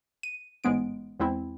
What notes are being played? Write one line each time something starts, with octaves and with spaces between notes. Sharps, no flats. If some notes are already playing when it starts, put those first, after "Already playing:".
D#7
A1 G#2 G#3 B3 D7
E2 G#3 C4 E4